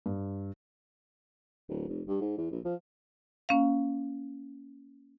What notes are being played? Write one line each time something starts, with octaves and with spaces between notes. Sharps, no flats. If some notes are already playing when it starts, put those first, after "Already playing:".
G2
D1
F1
G2
G#2
E2
A#1
F3
A#3 C#4 F5